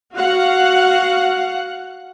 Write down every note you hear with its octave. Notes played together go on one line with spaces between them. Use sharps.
F#4 F5 F#5